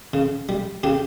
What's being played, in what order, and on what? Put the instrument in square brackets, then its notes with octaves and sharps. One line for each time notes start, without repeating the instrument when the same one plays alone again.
[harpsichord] C#3
G3
C#3 G4